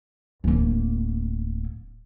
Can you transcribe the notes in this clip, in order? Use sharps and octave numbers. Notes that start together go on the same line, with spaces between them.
D1 A#3